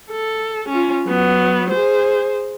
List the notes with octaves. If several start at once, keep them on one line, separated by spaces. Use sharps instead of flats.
A4
C#4 F4
F#3 B3
G#4 C5